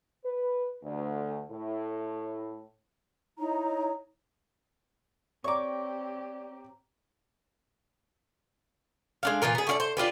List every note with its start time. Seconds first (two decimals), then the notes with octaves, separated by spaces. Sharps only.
0.24 B4
0.83 D2
1.51 A2
3.38 D#4 E4 C#5 A#5
5.44 C4 G4 C#5 D5 A#5 C#6 D6
9.23 G#3 D4 F5
9.42 A#2 E3 F4 A#4
9.55 B3 G#4
9.67 A3 F4 D5
9.80 C5
9.97 D4 F4 G4 B4